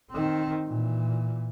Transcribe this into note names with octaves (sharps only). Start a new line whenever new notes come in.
D#3 C4
A#2 E3